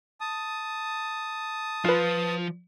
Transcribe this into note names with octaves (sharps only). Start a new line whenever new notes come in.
A5 D#6
F3 F4 B4